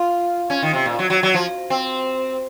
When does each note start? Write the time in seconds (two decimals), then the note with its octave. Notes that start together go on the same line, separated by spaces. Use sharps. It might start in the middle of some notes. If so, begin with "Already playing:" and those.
Already playing: F4
0.50 C#4
0.62 D#3
0.73 C3
0.86 A#2
0.99 F#3
1.10 F#3
1.23 F#3
1.34 F3
1.70 C4